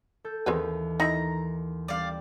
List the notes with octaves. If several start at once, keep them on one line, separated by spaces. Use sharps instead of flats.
A4 G6
D#2 E3 C4 G#4 B4
D#4 E4 A#5 C6
G3 C4 D5 F5